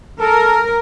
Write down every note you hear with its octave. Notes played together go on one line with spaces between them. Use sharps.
A4 A#4